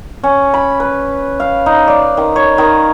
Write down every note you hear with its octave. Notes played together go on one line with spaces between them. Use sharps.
C#4
B5
B4
F5
D#4
D5
D#3
C#5
D#3